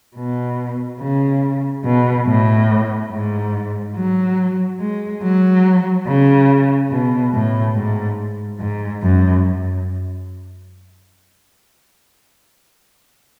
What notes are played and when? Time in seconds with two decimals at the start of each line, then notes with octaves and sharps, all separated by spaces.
0.16 B2
1.00 C#3
1.85 B2
2.27 A2
3.11 G#2
3.96 F#3
4.80 G#3
5.23 F#3
6.07 C#3
6.91 B2
7.33 A2
7.76 G#2
8.60 G#2
9.02 F#2